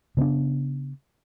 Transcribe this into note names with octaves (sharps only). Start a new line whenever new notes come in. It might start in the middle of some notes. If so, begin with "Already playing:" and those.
C#3 B3 C#4 D4